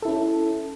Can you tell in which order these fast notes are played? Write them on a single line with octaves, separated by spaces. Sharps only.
A4 E4 C#4